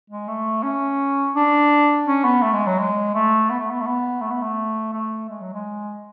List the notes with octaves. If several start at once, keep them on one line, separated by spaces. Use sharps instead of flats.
G#3
A3
C#4
D4
C#4
B3
A3
G#3
F#3
G#3
A3
B3
A3
B3
A3
B3
A3
B3
A3
A3
G#3
F#3
G#3